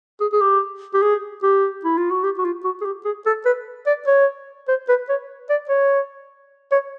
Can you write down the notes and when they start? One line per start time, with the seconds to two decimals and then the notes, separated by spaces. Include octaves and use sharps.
0.20 G#4
0.33 G#4
0.41 G4
0.94 G4
1.02 G#4
1.43 G4
1.85 E4
1.97 F4
2.11 F#4
2.23 G4
2.38 F#4
2.45 F4
2.64 F#4
2.81 G#4
2.85 G4
3.05 G#4
3.26 A4
3.45 B4
3.86 D5
4.07 C#5
4.68 C5
4.88 B4
5.09 C#5
5.50 D5
5.69 C#5
6.72 C#5